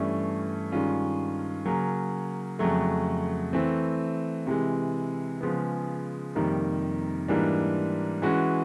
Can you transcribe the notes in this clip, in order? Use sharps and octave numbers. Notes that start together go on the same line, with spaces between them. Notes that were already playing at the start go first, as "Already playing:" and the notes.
Already playing: G2 E3 A3 C#4
G2 D#3 G#3 C#4 F4
C#3 F#3 A#3
F2 C#3 F#3 A3
E3 A3 C4
C3 E3 G#3
C#3 F3 G#3 B3
F2 C3 D#3 G3 A#3
G#2 E3 G3 A#3 D4
E3 G#3 C#4 F#4